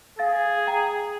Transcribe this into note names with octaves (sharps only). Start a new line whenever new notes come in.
G#4 F5 A6
G5 A#5